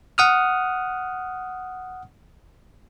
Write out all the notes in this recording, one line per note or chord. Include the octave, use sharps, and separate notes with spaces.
F#5 D#6 F6